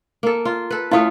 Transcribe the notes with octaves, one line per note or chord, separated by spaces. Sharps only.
A#3 A4
F4
A4 B4
A3 C#4 E4 F4 F5 D#6